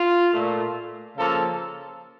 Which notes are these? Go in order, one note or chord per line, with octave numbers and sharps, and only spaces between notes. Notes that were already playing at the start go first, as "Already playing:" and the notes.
Already playing: F4
A#2 A3
C#3 F3 A#3 A4